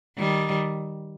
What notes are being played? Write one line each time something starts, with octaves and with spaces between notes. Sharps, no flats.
D#3 G3